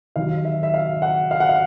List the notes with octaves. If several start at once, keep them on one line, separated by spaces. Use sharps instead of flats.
D#2 D#3 F#3 F5
E5
E5
F5
F#5
F5
F#5
F5